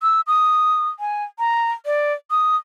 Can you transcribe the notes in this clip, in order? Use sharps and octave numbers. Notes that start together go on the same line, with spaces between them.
E6
D#6
G#5
A#5
D5
D#6